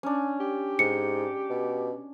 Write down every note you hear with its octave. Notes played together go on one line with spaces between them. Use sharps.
C#4 D4
G4
G#2 C#7
B2